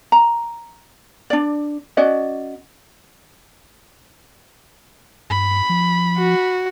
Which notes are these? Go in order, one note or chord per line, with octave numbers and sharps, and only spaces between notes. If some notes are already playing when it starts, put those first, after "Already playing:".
A#5
D4 D5
C#4 F#4 D5 D#5
G2 B5
F3
F#4